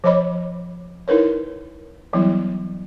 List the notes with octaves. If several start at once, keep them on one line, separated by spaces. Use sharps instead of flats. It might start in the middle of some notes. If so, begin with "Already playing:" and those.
F3 C5 C#5 D#5 B5 D6
D#4 E4 A#4 B4 C#5
E3 F#3 G3 B3 E4